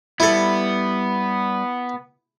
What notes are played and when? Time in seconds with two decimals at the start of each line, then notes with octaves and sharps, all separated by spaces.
0.20 G3 B3 E4 A4